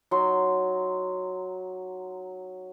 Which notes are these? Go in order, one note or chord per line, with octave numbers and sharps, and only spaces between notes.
F#3 D#4 C6